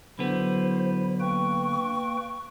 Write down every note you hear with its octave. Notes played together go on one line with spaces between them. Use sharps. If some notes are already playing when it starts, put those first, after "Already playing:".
D3 F#3 B3 E4 C5
A#3 B4 G5 C#6